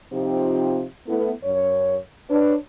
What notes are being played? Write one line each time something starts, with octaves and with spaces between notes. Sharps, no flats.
C3 F3 C4 D#4 F4 G4
A3 B3 E4
F#2 C#5
D4 B4 C#5